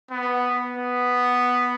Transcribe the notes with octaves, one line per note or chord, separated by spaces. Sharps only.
B3
B3